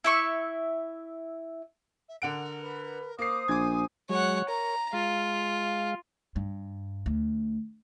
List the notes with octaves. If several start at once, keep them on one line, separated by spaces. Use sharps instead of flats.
E4 E5 C#6
E5
D3 A#4 F#5 D7
B4
A#3 C5 D6 D#6 C7
A#1 G#5 D6 G#6
F#3 G#3 C#5 F#5
A#4 C#5 A#5
G#3 F4 F5
G2
D2